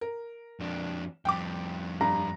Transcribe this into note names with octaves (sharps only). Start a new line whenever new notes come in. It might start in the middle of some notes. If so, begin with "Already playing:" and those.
A#4
F2 D4
F2 G3 G5 D6
G2 A#5